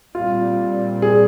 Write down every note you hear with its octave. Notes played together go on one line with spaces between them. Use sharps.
A#2 G3 C4 F4
G#4